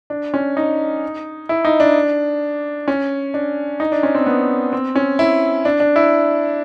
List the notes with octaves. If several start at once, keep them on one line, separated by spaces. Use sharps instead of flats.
D4
C#4
D#4
E4
D#4
D4
C#4
D4
D#4
D4
C#4
C4
B3
C4
C#4
E4
D4
D4
E4